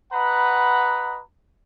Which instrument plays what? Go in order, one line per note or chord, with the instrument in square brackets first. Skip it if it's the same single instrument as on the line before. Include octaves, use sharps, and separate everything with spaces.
[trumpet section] F#4 B4 D#5 F#5 A#5 B5